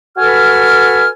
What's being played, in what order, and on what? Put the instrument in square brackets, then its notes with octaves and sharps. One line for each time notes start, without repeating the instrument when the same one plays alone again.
[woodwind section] F#4 A4 B4 G#5 F6